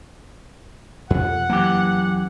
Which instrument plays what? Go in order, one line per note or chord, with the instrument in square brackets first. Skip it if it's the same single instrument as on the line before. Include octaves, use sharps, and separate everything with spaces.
[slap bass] F2 C3 [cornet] F#5
[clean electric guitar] F#2 E3 G4 [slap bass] A#3